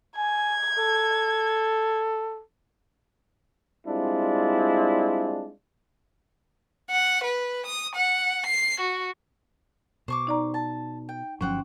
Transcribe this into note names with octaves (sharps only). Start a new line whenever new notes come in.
G#5 G#6
A4
G3 G#3 C4 D4 E4 F4
F#5
B4
D#6
F#5
C7
F#4
B2 C5 C#6 D6
D#4 D5 A#5
A5
G5
G1 F3 F#3 C#4 C5 F#5 G5